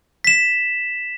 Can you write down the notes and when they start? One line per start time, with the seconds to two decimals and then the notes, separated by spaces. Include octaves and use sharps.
0.24 B6 E7